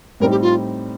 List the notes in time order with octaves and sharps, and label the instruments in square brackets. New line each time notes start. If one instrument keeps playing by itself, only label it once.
[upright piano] A2 G3 C4 D#4 [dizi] A#4
[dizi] G4
F4